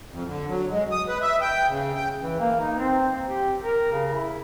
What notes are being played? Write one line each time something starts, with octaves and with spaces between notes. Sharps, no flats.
F2
D3
F#3
G#3
D#6
B4
E5
G5
C#3
G5
E3
A#3
D#4
C4
G4
A#4
C#3
E4